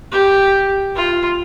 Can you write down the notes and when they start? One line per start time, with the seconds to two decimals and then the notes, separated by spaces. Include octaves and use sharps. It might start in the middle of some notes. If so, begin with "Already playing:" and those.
0.12 G4
0.96 F4